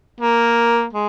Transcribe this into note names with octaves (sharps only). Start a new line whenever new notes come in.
A#3
G#3